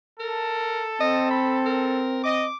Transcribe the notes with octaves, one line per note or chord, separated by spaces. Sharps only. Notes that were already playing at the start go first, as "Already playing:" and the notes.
A4 A#4
C4 D#5
B5
A#4
D#5 D6